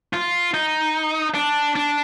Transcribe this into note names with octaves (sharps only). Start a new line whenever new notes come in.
F4
D#4
D4
D4